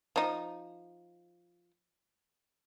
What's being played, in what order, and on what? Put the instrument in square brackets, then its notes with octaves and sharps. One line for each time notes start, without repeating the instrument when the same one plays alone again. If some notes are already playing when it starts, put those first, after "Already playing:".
[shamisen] F3 D#4